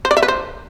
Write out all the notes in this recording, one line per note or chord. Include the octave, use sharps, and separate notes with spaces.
C5
D5
E5
B4
C5